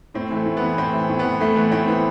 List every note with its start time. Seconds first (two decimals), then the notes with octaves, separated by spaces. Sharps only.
0.14 A2 C4
0.31 E3 A3
0.46 A2
0.57 B3
0.62 E3
0.77 A2 C4
0.93 E3
1.09 A2
1.19 B3
1.24 E3
1.40 A2 A3
1.56 E3 B3
1.71 A2 C4
1.87 E3 B3